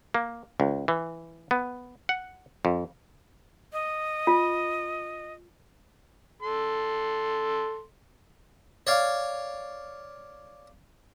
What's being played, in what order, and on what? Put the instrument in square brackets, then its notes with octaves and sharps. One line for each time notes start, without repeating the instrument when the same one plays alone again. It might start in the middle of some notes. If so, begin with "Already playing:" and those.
[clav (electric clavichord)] A#3
C#2
E3
B3
F#5
F2
[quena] D#5
[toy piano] F4
[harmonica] A4 C6
[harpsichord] C#5 D5 F5